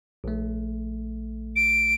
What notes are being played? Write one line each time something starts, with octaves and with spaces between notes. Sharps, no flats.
A#1 A3
D7